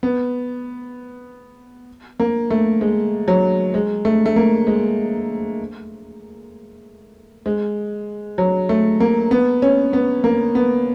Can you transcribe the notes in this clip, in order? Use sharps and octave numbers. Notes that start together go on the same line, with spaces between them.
B3
A#3
A3
G#3
F#3
G#3
A3
A3
A#3
G#3
G#3
F#3
A3
A#3
B3
C#4
B3
A#3
B3